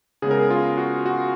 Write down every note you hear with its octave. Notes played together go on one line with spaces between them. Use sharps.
C#3 G#3 B3 G#4
A#4
G#4
F4
F#4
F#4